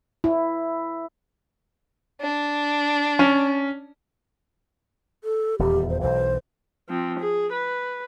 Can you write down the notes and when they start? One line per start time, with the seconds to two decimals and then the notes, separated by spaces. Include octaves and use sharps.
0.24 E4
2.21 D4
3.19 C#4
5.24 A4
5.59 D#1 E2 G4
5.89 C5
6.01 B1 E3 C5
6.89 F3 C4
7.19 G#4
7.52 B4